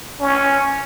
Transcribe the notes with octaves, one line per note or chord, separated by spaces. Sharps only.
C#4